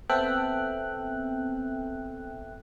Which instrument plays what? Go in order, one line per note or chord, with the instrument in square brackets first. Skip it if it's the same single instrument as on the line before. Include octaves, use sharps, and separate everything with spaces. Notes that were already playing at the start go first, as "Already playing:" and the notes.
[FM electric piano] B3 C4 A4 E5 G5 F#6